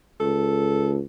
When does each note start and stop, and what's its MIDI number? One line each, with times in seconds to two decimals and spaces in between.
0.20 1.00 37
0.20 0.96 69